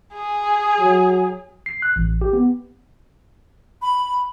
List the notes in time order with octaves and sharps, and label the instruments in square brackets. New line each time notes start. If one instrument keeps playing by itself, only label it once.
[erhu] G#4
[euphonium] F#3
[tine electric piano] C7
F#6
A1
G4
B3
[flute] B5